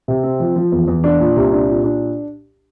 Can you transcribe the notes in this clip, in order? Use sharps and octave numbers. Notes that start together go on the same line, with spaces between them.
C3
C4
F3
F3
E2
E2
D4
A#2
C2
D4
A#2
D4